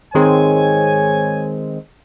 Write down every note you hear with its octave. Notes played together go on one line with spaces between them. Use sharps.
G#2 D#3 G#3 C4 C#5 G#5